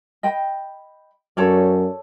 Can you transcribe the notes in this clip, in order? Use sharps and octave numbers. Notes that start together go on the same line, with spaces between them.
D#5 G5 B5
F#2 A4 C#5 D5